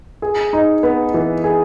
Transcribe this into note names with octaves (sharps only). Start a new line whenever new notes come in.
G#4
D#4
B3
E3
G#4